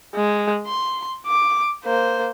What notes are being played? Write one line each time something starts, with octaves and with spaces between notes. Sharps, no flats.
G#3
C6
D6
A#3 C5